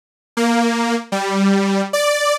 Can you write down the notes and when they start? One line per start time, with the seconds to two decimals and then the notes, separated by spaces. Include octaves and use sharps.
0.37 A#3
1.12 G3
1.93 D5